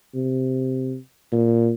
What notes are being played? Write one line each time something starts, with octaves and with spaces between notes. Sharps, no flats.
C3
A#2